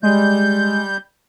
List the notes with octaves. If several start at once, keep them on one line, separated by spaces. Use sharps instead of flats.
G3 G#3 G6